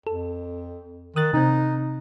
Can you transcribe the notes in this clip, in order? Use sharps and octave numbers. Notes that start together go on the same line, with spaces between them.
F2 A4
D#3 D#6 F#6 A6
C3 C4 D#4